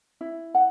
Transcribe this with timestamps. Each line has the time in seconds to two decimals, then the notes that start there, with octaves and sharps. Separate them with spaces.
0.21 E4
0.54 F#5